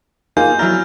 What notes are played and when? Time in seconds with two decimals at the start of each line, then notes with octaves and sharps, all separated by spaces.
0.37 A#3 D#4 F4 G#4 C5 G#5 G6
0.59 F#3 E4 D5 A#5 F6